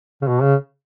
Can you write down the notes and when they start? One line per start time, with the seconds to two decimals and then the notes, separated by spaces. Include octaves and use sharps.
0.22 C#3
0.28 B2
0.42 C#3